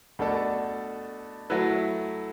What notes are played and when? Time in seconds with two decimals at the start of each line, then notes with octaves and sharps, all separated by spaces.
0.19 B2 A3 D4 A4
1.50 F#3 A3 E4 B4